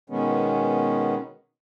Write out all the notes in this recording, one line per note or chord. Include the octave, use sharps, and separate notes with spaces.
B2 D#3 G#3 B3 C#4